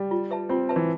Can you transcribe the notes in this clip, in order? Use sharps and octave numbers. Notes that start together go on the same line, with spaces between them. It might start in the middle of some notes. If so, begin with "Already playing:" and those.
Already playing: G3
F4
B4 E5 A5
C4 F4
B4 E5 A5
E3